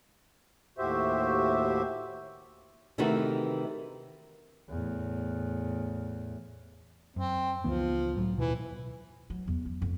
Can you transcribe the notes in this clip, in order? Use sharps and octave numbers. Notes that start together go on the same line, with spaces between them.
D#2 A2 F#4 G4 C5 E5
C3 D#3 E3 A3 D#4 F#4
E2 A2
F#2 C4
C#2 E3 F3 B3
C#2 A2 F#3
D#1 B2 E3
F#3
E2
F#3
F2